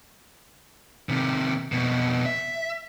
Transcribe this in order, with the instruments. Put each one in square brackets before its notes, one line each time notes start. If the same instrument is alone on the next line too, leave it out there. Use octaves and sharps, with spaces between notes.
[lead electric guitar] C3 D#3
F2 B2
E5